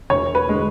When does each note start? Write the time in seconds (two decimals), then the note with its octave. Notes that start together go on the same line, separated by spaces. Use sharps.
0.10 E1 C#5
0.35 B4
0.49 D3 G#3